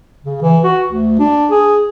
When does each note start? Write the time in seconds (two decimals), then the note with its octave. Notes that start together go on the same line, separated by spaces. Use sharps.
0.25 C#3
0.42 E3
0.64 F#4
0.88 D2
1.19 D4
1.51 G#4